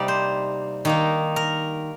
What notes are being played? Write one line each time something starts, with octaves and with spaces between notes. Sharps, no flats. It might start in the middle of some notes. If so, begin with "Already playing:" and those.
Already playing: C3 G3 A#3 D#4 D5
C5
D#3 A#3 D#4
A#4